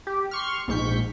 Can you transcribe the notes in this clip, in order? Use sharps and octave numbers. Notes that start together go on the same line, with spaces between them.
G4
C6 C#6 F6
A#1 G#2 C#6 G6 B6